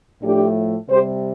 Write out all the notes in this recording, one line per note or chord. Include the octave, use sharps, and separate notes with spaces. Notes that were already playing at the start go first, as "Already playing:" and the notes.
A2 F3 A3 D4 G4
C3 G3 G4 C5